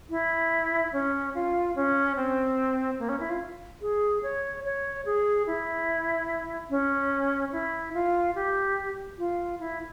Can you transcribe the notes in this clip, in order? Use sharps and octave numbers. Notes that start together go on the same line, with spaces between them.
E4
C#4
F4
C#4
C4
A#3
C#4
E4
F4
G#4
C#5
C#5
G#4
E4
C#4
E4
F4
G4
F4
E4